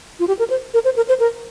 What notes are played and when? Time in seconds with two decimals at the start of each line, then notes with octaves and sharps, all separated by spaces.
0.19 F4
0.28 G4
0.39 A#4
0.50 C5
0.74 A#4
0.85 C5
0.96 A#4
1.09 C5
1.20 A#4